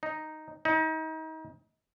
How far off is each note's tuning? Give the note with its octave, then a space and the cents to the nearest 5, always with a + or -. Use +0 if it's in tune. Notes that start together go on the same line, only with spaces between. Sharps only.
D#4 +0
D#4 +35